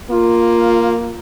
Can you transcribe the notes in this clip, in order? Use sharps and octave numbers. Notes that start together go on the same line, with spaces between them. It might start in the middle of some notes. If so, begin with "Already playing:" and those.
A#3 F4